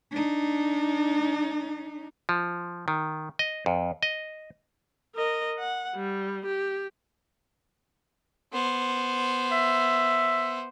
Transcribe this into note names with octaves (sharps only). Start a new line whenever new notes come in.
D4 D#4
F3
D#3
D#5
F2
D#5
A#4 D#5
F#5
G3
G4
B3 C5
E5